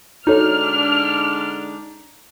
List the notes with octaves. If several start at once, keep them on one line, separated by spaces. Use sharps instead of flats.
D3 G#3 D4 D#4 F#4 A4 C#5 F6